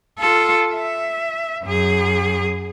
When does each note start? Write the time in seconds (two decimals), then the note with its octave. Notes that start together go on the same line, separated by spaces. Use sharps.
0.19 F4 A4
0.74 E5
1.64 F#2 G#4